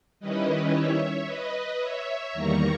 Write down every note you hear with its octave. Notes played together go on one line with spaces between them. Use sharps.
D#3 G3 C#4 E4 B4 D#5
C#5 E5
B4 D#5
C#5 E5
E2 D#3 G3 A#3 A#5 C#6